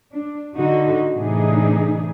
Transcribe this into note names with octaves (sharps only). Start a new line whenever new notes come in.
D4
D3 D#4 F#4
A2 C3 E3 D4 D#4 G#4